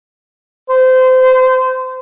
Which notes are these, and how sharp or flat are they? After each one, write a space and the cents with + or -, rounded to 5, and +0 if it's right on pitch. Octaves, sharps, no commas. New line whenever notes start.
C5 -25